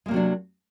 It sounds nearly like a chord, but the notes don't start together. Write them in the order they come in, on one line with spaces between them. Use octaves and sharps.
G#3 A#3 C3 F#3 D4